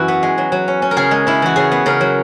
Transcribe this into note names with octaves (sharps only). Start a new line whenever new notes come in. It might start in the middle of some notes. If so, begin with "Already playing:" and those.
Already playing: F#2 E3 E4 F#4
B3
G#3
F#3
F#3
C#4
C#4
A#4
C#3 G#4
G#3
C#3 E4
E3 F#4
C#3 G#4
B3
C#3 A#4
F#3